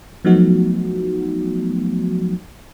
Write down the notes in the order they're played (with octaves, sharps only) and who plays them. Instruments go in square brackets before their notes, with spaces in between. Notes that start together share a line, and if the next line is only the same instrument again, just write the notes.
[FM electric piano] F3 F#3 A3 B3 D#4 F#4